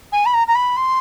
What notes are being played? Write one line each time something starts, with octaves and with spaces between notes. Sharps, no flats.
G#5
B5
A#5
A#5
B5
C6